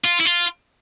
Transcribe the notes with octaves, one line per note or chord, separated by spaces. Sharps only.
F4
E4
F4